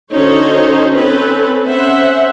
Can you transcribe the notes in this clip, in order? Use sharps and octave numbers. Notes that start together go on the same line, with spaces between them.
D3 C#4 D#4 F#4 C5 C#5
C4 C#4 A4 B4
C#4 C5 E5 F#5